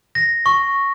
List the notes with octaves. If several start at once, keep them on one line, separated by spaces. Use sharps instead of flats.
A#6
C#6